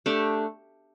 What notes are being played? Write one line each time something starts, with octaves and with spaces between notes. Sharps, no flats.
A3 D4 G4